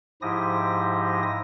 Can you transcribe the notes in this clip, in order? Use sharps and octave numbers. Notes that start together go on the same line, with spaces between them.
G#2 F3 E4 G4 D#6 A#6